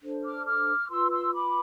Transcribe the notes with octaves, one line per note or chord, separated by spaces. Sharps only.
D4 A4 C5
D6 F6
D6 F6
F4 B4 C6 E6
C6 E6
B5 D6